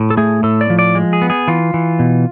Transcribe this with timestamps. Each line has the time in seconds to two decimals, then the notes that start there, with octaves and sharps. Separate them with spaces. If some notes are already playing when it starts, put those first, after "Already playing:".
Already playing: A2
0.10 A4
0.17 A3 G#4
0.43 A2 A4
0.61 D5
0.70 F3
0.79 D5
0.95 G#3
1.13 G#4
1.22 B3
1.30 G#4
1.48 E3 F4
1.74 E3
1.99 B2